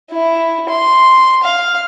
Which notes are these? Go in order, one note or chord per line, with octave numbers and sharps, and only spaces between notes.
E4
C6
F5